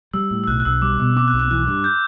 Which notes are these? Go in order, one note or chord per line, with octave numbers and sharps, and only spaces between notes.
G3 E6
A2
E6
B1 F#6
F#6
B1 E6
G3 D6
B2
C4 D6
F#6
B1
F#6
E3 F#6
G2
G6